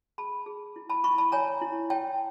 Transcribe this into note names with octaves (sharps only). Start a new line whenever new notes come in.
G#4 A5 B5
G#4
E4
A5 B5
E4 B5 C#6
A5 B5
C#5 G#5 A#5
E4
C#5 G5 A5